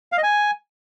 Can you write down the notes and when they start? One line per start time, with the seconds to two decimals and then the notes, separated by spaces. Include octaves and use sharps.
0.12 F5
0.18 D#5
0.23 G#5